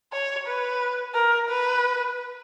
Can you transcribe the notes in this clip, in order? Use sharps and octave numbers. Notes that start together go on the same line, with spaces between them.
C#5
B4
A#4
B4